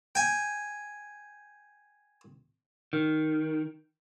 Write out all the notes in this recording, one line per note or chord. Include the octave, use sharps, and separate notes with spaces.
G5 G#5
D#3